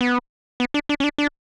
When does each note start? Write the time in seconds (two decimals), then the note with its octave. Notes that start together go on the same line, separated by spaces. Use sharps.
0.01 B3
0.60 B3
0.74 D4
0.89 D4
1.00 C#4
1.04 D4
1.18 D4